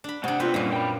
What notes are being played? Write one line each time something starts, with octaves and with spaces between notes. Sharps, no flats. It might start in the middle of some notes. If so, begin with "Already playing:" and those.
D4 B5
C3 A3 D4 F#5
B3 C4 F4 B4
F#2 A#2 G3 A#3
G5 B5